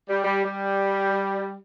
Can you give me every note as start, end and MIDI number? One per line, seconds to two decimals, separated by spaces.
0.09 0.24 55
0.24 0.44 55
0.44 1.56 55